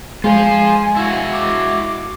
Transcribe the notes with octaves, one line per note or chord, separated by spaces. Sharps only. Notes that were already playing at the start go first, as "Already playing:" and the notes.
G#3 F4 C5 G#5
E4 F#4
D6